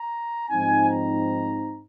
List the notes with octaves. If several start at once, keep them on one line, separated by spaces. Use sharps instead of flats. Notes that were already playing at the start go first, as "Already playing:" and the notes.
Already playing: A#5
G#2 F3 C4 D#4 G#5
A#5